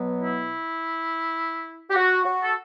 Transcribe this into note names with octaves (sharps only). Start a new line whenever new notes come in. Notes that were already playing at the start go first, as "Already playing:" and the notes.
Already playing: B2 F#3 B3
E4
G4
F#4
F#4
A4